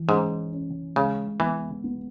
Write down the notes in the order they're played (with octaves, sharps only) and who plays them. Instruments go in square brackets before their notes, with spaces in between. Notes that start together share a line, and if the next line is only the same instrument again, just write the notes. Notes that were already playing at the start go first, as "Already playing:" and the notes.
Already playing: [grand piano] E3
[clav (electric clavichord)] G#2 [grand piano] C#4
[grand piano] C#4
[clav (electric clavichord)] C#3 [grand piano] G#3
[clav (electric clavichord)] E3 [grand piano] B3
[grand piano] B3